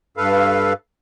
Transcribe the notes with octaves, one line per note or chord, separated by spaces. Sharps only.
G2 A4 B4 F5